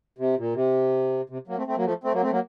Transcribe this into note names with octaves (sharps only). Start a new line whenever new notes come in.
C3
A#2
C3
C3
F#3 A#3
A3 C4
A3 C4
F#3 A#3
F3 A3
A3 C4
F#3 A#3
A3 C4
F#3 A#3